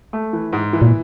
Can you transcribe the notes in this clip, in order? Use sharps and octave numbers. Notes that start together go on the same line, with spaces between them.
A3
E3
G#2
E3
A#2